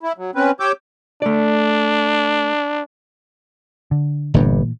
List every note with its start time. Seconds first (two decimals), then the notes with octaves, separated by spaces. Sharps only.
0.03 E4
0.18 F#3
0.35 C4 C#4 B4
0.60 G4 C#5 D6 E6 G6
1.22 A3 D4 D5
3.91 D3
4.34 G1 G2 A#2 E3 A#3